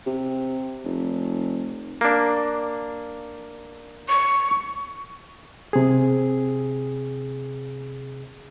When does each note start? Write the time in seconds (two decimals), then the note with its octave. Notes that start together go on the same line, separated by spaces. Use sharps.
0.06 C3
0.85 F1
2.01 A#3 D4
4.09 C#6
5.73 C3 G#4